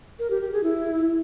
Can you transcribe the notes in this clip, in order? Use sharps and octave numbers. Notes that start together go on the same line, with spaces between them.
A#4
G4
G4
G#4
E4